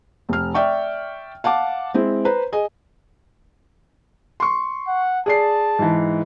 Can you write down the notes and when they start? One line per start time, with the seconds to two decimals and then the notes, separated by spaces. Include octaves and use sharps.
0.29 F1 F6
0.54 D5 E5 G5 C#6
1.44 F5 F#5 A5 D6
1.94 G#3 C4 E4
2.25 B4 C5 A#5
2.52 G#4 D#5 G#5
4.40 C6 C#6
4.87 F#5
5.26 G#4 D5 A5 C7
5.79 G#2 E3